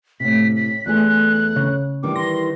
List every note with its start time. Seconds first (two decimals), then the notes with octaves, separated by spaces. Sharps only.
0.20 A2 C3 B6
0.57 B6
0.86 E2 A3 G#4 F#6
1.56 C#3
2.03 D#3 E3 G3 D6
2.16 C6 A#6